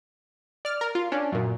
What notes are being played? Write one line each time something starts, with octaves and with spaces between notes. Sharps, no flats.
D5 F6
A#4
F4
C#4 D4
F#2 A#2